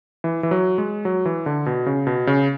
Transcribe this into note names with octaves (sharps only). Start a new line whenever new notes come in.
E3
E3
F#3
G#3
F#3
E3
D3
B2
C#3
B2
C#3